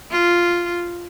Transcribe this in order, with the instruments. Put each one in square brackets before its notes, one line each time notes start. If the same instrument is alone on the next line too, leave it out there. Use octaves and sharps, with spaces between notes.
[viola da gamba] F4